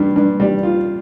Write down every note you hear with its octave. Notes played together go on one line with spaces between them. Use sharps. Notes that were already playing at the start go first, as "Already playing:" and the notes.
Already playing: G2 G3
G2
G3
F4